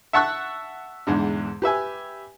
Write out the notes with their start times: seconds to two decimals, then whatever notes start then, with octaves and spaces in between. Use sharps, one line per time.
0.13 E5 F#5 A5 C#6 E6 F#6
1.07 E2 G#2 D3
1.62 G4 B4 E5 G#5